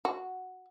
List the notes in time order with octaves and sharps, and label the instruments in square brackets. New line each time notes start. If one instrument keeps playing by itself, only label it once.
[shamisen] F#4